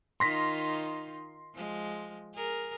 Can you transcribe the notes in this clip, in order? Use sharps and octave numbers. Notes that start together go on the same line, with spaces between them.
D#3 D#4 F4 C6 A#6 B6
F3 G#3
G#4 A#4